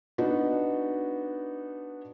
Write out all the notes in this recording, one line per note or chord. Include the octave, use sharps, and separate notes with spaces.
B3 D4 D#4 F#4